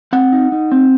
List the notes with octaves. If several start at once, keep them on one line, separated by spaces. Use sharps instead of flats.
C4 F#5
D#4
D#4
C4